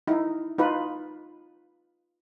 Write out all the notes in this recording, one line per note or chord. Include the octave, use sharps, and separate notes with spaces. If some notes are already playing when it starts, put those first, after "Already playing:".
D#4 E4
D#4 F4 B4